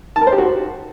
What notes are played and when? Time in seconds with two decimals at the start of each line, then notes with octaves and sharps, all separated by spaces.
0.16 A5
0.21 A#4
0.27 C5
0.32 G4
0.38 F#4